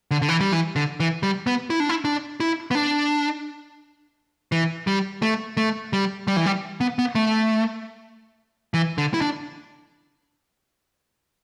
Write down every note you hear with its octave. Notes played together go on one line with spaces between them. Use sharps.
D3
D3
E3
G3
E3
D3
E3
G3
B3
E4
D4
E4
D4
E4
B3
D4
E3
G3
A3
A3
G3
G3
E3
G3
B3
B3
A3
E3
D3
E4
D4